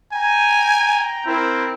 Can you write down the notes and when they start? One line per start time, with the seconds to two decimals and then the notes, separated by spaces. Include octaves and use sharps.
0.13 G5 G#5 A#5
1.27 C4 E4 A#4